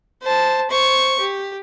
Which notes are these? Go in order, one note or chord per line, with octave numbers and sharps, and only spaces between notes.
C5 A5
C5 C#6
G4